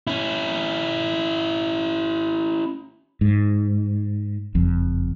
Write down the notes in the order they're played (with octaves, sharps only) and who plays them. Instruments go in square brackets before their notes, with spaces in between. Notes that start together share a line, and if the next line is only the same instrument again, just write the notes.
[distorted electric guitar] C#4 E4
[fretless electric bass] G#2
F#1 F2